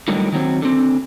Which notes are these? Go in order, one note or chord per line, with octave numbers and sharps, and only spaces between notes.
A2 D3 D#3 F#3 G3
D#3 F#3 B3 C4
D3 C4